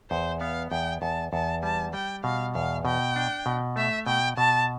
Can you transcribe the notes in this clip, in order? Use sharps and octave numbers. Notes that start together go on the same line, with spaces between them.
E2 C5
B3 F5
E2 G5
E2 A5
E2 A5
G3 A5
G3 G5
B2 F5
E2 F5
B2 G5
D4
B2
A3 E5
B2 G5
B2 A5